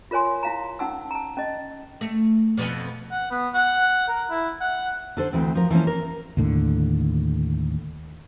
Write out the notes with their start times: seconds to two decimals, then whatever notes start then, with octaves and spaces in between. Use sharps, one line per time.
0.11 F4 A#4 C#5 G#5 C6
0.43 E4 F5 A#5
0.79 C#4 D#4 F#5 A5 E6
1.11 A5 A#5
1.37 C#4 D#5
2.01 A3
2.58 F2 B2 F3
3.11 F#5
3.31 B3
3.54 F#5
4.08 A#4
4.31 E4
4.61 F#5
5.17 D3 A4 C5
5.33 D2 E3 C4
5.55 F3 A#4
5.70 E3 F3 A#3 C#4
5.87 A#4
6.37 D#2 A2 D3